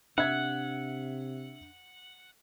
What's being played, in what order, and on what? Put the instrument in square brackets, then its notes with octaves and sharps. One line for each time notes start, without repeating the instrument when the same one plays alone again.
[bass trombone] C3 [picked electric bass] D4 [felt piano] E5 G#6 [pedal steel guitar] F#5